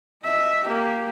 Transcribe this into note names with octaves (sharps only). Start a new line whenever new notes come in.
D#5 E5
A#3 G4